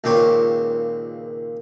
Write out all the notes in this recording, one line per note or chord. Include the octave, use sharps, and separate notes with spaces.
C#2 A#2 D#3 C4 G4 C#5